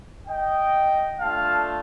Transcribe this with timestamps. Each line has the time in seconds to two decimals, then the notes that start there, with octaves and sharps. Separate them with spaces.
0.27 D#5 G5
1.19 A3 D4 F4 F5 A5